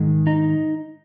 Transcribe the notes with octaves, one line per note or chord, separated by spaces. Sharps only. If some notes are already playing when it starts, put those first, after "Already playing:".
Already playing: G#2 D#3 G#3
D#4